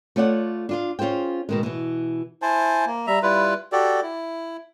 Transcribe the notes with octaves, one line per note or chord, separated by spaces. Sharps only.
A3 F4 C#5 D5 F#5
D4 F4 F5
C#4 F4 G#4 C5 G5
B2 D#3 G#3
B2 E3
E4 C5 G#5 A5
A#3
G3 E5 A#5
G3 E4 F4 B4
F#4 G4 A4 D5
E4